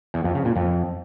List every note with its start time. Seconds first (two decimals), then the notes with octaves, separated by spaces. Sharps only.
0.14 E2
0.24 F2
0.35 C#3
0.45 A#2
0.56 F2